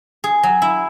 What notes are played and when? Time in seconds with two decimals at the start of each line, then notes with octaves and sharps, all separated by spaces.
0.24 G#4
0.43 F#3
0.62 E4